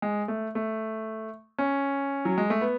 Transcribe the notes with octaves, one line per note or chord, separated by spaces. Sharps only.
G#3
A3
A3
C#4
F#3
G#3
A3
B3